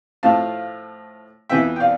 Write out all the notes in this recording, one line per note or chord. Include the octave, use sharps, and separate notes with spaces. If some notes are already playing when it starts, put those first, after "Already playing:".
A2 F3 A3 F5 A5
F2 E3 B3 E4 E5 G5
G5
D5 F5